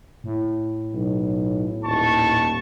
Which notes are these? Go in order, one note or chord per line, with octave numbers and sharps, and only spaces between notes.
A2
B1
D#1 A5 C#6